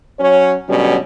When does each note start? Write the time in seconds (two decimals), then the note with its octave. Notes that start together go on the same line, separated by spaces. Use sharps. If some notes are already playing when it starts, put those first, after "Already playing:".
0.19 F#3 C#4 C#5
0.69 D2 B2 F#3 G3 C#4